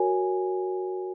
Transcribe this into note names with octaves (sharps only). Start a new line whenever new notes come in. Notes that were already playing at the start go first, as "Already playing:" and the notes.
Already playing: F#4 A#4 C#5 G#5